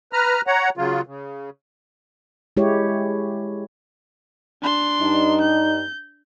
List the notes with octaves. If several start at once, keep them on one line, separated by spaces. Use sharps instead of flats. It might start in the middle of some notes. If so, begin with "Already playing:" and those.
B4 A#5 F6
C#5 F#5 A#5
C#3 F#3 F4
C#3
G#3 E4 G4 C#5
D4 C6
G2 D#4
G6